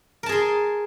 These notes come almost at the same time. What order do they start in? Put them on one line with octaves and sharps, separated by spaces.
A#4 A5 G#4 C6